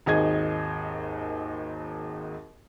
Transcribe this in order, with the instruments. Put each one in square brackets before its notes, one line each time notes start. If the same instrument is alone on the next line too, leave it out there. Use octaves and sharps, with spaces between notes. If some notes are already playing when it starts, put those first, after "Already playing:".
[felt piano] G#1 D#2 G#4 D#5 G#6